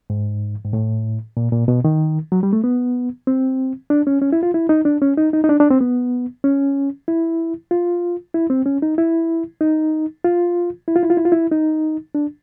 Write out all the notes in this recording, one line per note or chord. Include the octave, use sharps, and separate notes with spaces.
G#2
G#2
A2
A#2
A#2
B2
D#3
F#3
G3
A3
B3
C4
D4
C#4
C#4
E4
F4
E4
D#4
D4
C#4
D#4
D#4
D#4
D4
D4
C4
B3
C#4
E4
F4
E4
C4
C#4
D#4
E4
D#4
F4
E4
F4
E4
F4
E4
F4
E4
D#4
D4